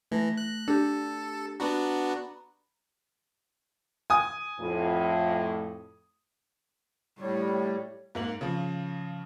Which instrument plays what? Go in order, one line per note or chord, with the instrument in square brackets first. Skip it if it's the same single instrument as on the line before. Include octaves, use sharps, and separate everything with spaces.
[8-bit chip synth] E3 [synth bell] A3 A#6
[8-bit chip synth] F#6
[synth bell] D4 G4 [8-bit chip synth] A4
[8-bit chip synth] B3 D4 F#4 [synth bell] A#5 B5
[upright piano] G#5 D#6
[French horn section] F2 A2
[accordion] A2 G3 [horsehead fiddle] C#5
[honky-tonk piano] G#2 A#3 F#7
C#3 F3